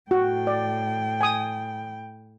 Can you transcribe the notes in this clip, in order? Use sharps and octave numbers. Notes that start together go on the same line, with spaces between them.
A2 F#4 G5
D5
G#5 D#6